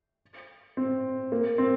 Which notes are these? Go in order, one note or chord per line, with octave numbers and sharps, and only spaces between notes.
C4
A#3
C4